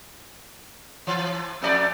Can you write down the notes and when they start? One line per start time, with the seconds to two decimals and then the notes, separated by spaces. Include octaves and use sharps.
1.07 E3
1.62 F2 A3 D5